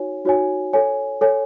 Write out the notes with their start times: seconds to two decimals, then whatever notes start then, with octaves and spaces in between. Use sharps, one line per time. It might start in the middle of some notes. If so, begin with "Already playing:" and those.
Already playing: D#4 F#4 C#5 G#5
0.25 D#4 F#4 C#5 G#5
0.73 A4 C#5 G#5
1.21 A4 C#5 G#5